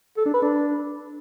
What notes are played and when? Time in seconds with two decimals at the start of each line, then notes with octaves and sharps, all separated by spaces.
0.17 A4
0.25 D4
0.34 B4
0.42 D4